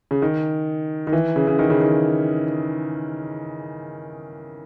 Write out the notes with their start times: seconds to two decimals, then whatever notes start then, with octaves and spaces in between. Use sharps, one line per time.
0.11 C#3
0.22 D#3
1.07 D#3
1.13 E3
1.36 C#3
1.47 C#3
1.59 D#3
1.70 C#3
1.81 D#3